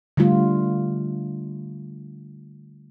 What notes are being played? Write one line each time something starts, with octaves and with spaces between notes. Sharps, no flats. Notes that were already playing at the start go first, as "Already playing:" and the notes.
D3 G3 A3 F4